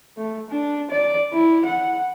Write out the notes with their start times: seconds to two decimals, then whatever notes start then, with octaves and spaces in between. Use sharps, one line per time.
0.17 A3
0.50 D4
0.91 D5
1.33 E4
1.65 F#5